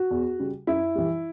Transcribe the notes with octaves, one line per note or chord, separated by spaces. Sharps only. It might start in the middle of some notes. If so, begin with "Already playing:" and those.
Already playing: F#4
E2
C#3 G3
F#2 E4
E3 G3